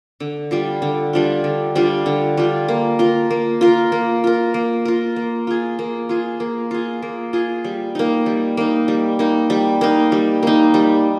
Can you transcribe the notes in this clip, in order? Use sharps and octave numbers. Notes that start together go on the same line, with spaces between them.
D3
G3 D4 F4
D3
G3 D4 F4
D3
G3 D4 F4
D3
G3 D4 F4
A#3
F4 A#4
A#3
F4 A#4
A#3
F4 A#4
A#3
F4 A#4
A#3
F4 G#4
A#3
F4 G#4
A#3
F4 G#4
A#3
F4 G#4
G3
A#3 D#4
G3
A#3 D#4
G3
A#3 D#4
G3
A#3 D#4
G3
A#3 D#4
G3